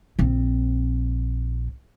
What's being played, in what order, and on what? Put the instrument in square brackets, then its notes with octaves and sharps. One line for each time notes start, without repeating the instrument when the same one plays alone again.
[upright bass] A#1 C4